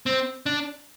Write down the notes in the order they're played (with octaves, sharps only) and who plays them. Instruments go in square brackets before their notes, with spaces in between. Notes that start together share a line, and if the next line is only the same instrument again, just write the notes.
[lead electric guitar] C4
D4